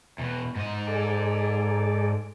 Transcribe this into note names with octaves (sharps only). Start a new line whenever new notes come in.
E2 B2
G#2 D#5
G#4 A4 D5